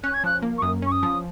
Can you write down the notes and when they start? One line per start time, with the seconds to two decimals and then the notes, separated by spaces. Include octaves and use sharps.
0.04 C#4 F#6
0.14 G#6
0.24 F3 F#6
0.42 A#3
0.58 C#6
0.62 F#2 D#6
0.82 C#4 C#6
0.92 D#6
1.03 F3